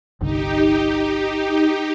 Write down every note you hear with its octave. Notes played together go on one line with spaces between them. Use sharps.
G1 C2 D3 D#4 G4